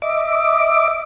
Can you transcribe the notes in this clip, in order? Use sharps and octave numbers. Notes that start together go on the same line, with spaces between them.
D#5 E5 D6